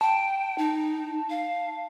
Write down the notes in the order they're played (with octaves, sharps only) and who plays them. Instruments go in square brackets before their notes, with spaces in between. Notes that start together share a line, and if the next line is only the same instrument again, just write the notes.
[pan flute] G5 [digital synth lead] A5
[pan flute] D#4
F5